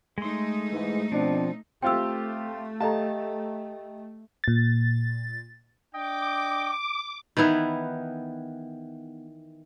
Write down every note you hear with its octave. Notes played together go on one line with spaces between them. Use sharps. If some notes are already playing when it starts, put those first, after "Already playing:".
G#3 A3 D#4 C6
G#2 E3
B2 F3 C4 D4
A3 C4 F4 G4 G5 E6
G4 A4 D#5 F5 G5 A5 A#5
A#2 A6
D4 D#5 G5 D6
D#3 E3 B3 E4